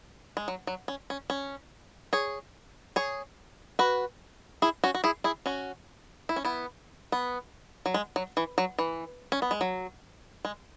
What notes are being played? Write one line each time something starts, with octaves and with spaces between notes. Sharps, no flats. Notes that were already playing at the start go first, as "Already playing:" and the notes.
G#3
F#3
F#3
C#4
C#4
C#4
G#4 C#5
G#4 C#5
F#4 B4
E4 G#4
C#4 F#4
F#4
E4 G#4
E4 G#4
C#4 F#4
E4
C#4
B3 E4
B3
F#3
G#3
F#3
E3
F#3
E3
C#4
B3
G#3
F#3
G#3